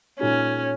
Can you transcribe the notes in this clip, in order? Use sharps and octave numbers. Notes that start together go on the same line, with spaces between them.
A#2 G#3 C#4 D#4